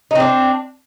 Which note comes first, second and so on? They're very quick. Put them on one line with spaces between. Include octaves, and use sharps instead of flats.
D#4 C4 D4